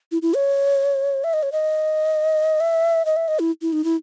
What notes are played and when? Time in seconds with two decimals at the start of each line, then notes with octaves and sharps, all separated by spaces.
0.12 E4
0.22 E4
0.34 C#5
1.24 E5
1.34 D#5
1.43 C#5
1.52 D#5
2.60 E5
3.05 D#5
3.16 E5
3.28 D#5
3.39 E4
3.62 E4
3.73 D#4
3.84 E4